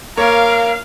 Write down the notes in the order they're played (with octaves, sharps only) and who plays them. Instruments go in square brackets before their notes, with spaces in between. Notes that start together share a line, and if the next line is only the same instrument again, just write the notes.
[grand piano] A#3 C#5 [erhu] A#4 [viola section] F5